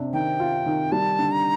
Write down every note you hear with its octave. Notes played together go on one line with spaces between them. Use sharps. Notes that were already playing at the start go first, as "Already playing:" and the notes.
Already playing: C3 D4
D#3 G5
F4
D#3
G3 A5
D3
A#5